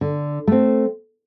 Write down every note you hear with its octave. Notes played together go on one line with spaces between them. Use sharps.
D3
A3 C4